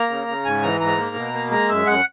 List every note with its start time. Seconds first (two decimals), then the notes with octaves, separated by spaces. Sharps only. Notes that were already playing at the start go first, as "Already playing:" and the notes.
Already playing: A#3 A#5
0.10 C#3
0.28 C#3
0.45 G#2 G#5
0.63 E3 A#5
0.80 G#2 A#5
0.98 A#3
1.16 B2
1.33 A#3
1.51 G#3 A#5
1.69 F#2 E5
1.87 F#2 F#5